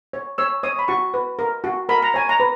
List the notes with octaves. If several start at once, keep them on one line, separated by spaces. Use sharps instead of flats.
C#5
C#5 E6
C#5 D#6
B5
F#4 C#6
B4
A#4
F#4
A#4 B5
A#5
C#5 G#5
A#5
B4